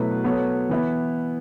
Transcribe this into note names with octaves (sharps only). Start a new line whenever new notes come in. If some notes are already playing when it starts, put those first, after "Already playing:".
Already playing: B2 F#3 A3 E4 B4
F#3 B3 A4 C#5
E3 B3 E4